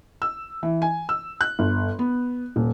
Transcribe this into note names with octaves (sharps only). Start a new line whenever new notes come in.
E6
E3
G#5
E6
F#6
G1
B3
D#1